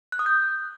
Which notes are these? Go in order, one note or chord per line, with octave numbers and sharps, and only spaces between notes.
F#6
D#6
G6